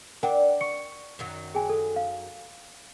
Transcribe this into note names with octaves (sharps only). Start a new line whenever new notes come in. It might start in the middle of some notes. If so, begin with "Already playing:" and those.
D4 A#4 F#5 G5
C#6 C#7
F#2 D#3 F#3
G#4 G5 G#5
A4
F5